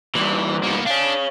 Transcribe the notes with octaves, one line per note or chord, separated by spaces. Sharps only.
G2 A#2 E3
A#3 B3
D4 C#5 F5